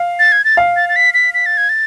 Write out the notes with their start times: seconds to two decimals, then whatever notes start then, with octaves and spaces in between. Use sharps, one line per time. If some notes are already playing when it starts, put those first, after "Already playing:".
Already playing: F5
0.19 A6
0.32 G#6
0.45 A6
0.57 F5
0.76 A6
0.89 A6
0.96 B6
1.14 B6
1.34 B6
1.46 A6
1.57 G#6
1.69 A6